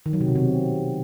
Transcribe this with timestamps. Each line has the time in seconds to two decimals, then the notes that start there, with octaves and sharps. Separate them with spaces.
0.06 D#3
0.13 F#3
0.21 C3
0.28 B2
0.35 C3